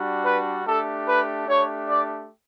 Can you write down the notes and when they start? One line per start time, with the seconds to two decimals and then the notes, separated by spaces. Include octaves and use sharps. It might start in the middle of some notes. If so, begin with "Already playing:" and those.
Already playing: G3 D4 F#4
0.25 B4
0.65 A3 D4 G4 A4
1.07 B4
1.47 A3 D4 G4 C#5
1.88 D5